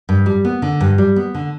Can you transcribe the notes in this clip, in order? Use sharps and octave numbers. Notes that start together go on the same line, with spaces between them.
G2
G3
B3
D3
G2
G3
B3
D3